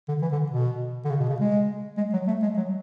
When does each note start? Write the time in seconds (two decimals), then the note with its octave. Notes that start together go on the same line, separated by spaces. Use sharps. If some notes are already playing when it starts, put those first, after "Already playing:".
0.08 D3
0.22 E3
0.32 D3
0.52 B2
1.05 D3
1.10 C#3
1.20 B2
1.29 C#3
1.40 G#3
1.97 G#3
2.13 F#3
2.28 A3
2.42 G#3
2.57 F#3